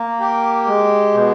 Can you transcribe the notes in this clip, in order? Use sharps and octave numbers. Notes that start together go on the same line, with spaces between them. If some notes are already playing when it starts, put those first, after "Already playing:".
Already playing: A#3
G4
G#3
B2